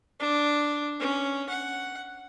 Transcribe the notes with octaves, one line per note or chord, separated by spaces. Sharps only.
D4
C#4
F#5